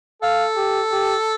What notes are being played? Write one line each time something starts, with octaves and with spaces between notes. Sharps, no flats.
A4 F5
G4
G4